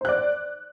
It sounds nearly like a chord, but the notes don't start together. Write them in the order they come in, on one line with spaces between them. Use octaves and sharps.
C5 F#6 D5